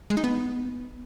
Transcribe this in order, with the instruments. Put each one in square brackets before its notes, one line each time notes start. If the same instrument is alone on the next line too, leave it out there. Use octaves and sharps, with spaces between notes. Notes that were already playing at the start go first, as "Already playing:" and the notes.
[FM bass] G#3
D#4
B3